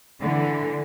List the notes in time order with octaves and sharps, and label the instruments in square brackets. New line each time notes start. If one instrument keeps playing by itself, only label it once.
[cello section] D3 E3